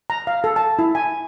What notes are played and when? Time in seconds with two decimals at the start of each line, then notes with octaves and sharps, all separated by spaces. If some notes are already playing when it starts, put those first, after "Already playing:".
0.10 A#5
0.27 F5
0.44 A4
0.56 A5
0.79 E4
0.95 G#5